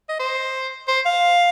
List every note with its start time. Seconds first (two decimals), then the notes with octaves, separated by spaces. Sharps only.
0.09 D#5
0.20 C5
0.88 C5
1.06 F5